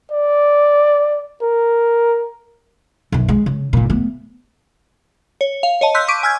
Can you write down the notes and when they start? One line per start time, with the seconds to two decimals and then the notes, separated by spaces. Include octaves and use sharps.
0.12 D5
1.42 A#4
3.12 B1 F#2
3.28 G#3
3.46 C#3
3.73 G#1 A#2
3.90 A3 B3
5.41 C#5
5.63 F5
5.81 C#5 D#5 A5
5.95 C6 E6 F#6 G6 B6
6.08 C#6 D6 B6 D7 D#7
6.23 G#5 E6 F6 G6 G#6